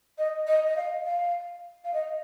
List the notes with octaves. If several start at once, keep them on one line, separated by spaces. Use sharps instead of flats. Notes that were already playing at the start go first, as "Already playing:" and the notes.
D#5
D#5
D#5
F5
F5
F5
D#5